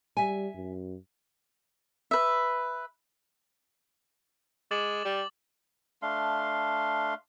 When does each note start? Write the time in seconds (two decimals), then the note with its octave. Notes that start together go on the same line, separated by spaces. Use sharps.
0.17 G3 E5 G#5
0.55 F#2
2.11 B4 E5
4.71 G#3 D6 A6 F#7
5.05 G3
6.02 A3 D4 F5 C6